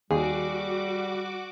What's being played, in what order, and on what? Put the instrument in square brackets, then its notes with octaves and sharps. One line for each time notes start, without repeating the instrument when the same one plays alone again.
[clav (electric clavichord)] D#2 [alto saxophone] G3 [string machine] F#4 D6 [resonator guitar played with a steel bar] G#4